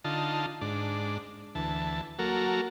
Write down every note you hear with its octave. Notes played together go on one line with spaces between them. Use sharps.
D3 D#4 F4 A5
G#2 D4
D2 E3 A5
F#3 A#3 F#4 A4 A#4